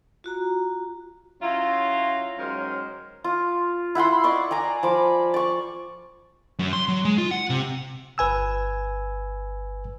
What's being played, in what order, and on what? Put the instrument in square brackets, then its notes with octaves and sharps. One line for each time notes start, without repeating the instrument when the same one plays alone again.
[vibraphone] F4 F#4 A#5
[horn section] F#3 C#4 E4 F4 A#5 C6
D#3 F#3 G#3 C#4 A#4 C5
[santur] F4
E4 F#5 B5 C6
D5 D#5 C#6
D5 G#5 A#5
F3 B5 D6
D5 C#6
[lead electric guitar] F#2
C6
F#3
G#3
F4
F#5
C3
[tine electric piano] G1 B4 G#5 E6